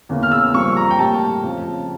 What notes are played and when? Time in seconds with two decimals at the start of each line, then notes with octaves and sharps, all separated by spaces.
0.09 E2 C#3 E3 A#3
0.23 F6
0.31 E6
0.54 G2 F3 A#3 C#6
0.77 A#5
0.91 G5
0.99 A2 G3 A#3 A5
1.43 F2 C#3 F3